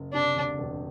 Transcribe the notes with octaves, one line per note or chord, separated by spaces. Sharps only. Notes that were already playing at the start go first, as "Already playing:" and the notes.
Already playing: F#1
C3 D4
D2
E1